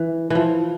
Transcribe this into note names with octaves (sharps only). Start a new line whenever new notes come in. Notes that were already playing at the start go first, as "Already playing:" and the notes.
Already playing: E3
E3 F3